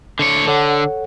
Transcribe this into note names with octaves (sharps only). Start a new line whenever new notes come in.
D3 C#5
D3 A4 C#5 F#5